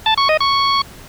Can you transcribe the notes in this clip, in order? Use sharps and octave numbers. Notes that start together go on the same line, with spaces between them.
A5
C#6
D#5
C#6